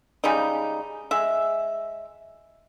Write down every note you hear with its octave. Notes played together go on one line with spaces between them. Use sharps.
C#3 G3 G#3 D#4
G#3 E5